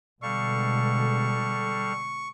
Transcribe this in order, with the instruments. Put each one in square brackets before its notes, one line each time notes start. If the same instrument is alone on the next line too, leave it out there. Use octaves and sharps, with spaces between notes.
[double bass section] B2 D3 G#3 [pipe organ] G3 A4 F5 [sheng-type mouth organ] C#6